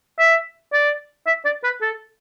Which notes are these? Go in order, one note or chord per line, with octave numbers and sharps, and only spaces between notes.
E5
D5
E5
D5
B4
A4